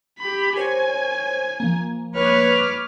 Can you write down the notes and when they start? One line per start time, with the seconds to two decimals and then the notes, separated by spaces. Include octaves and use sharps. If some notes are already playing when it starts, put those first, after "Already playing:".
0.19 G4 B5
0.56 A#4 C5 C#5 G#5
1.60 F3 A#3
2.16 B4 C#5 D6 F6